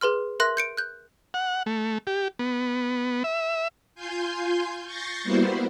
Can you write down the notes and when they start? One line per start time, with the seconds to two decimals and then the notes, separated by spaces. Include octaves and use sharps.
0.01 G#4 B4 C6 F6
0.40 A#4 E5 C6 F#6 A#6
0.57 G6 C#7 D7
0.77 F#6 G6
1.34 F#5
1.66 A3
2.07 G4
2.39 B3
3.24 E5
3.95 F4 G#5 C6 G6
4.84 C#6 G6 A6 A#6 C7
5.23 G3 A#3 B3 E4 F#4 C5